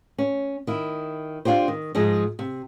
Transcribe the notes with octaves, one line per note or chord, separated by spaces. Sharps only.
C#4
D#3 E4
D4 F4 G4 C5
D#3
G#2 F3 G#3
C3